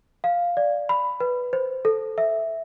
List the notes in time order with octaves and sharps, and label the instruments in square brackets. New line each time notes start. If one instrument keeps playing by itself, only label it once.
[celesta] F5
D5
B5
B4
C5
A4
E5